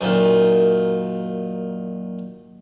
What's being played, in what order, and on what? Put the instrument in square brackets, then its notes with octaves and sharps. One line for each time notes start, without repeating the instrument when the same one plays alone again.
[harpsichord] F#2 A#2 D#3